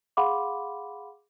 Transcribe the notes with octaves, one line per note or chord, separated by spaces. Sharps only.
G#4 F5 F#5 B5 C6 D6